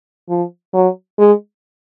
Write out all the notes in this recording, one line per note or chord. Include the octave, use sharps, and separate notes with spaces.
F3
F#3
G#3